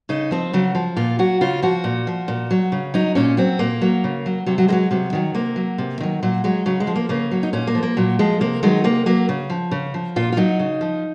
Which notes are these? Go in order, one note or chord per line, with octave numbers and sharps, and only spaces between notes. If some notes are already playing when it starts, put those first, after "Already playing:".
C#3 D#4
F3 C4
C#3 F#3
F3
A#2 F4
F#3 F#4
C#3 F4
F3 F#4
A#2
F3
A#2
F#3
C#3
F#3 D#4
A#2 C#4
F#3 C4
A#2 A#3
F#3
C#3
F#3
C3 F#3
F#3
D#3 F#3 G#3
C3 F#3
D#3 F#3
C3 A#3
F#3
C3
D#3 F#3
A#2 F#3
F#3 G#3
C#3 F#3
G#3
F3
A#3
C#3 A#3
F#3
D#4
A#2 C#4
A#3
F3
A#3
A#2 F#3
F3 G#3
C3 A#3
D#3 F#3 G#3
C3 A#3
F#3 A#3
C#3
F3
C#3
F3
A#2 F4
F4
F#3 D#4
C#3
F3